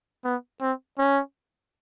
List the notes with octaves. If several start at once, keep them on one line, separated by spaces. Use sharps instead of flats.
B3
C4
C#4